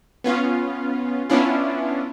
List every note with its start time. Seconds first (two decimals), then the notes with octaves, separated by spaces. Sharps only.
0.24 B3 C#4 F4
1.30 B3 C#4 D4 E4 F4